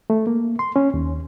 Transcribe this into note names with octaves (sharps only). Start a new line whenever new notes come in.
A3
A#3
C6
C#4
D#2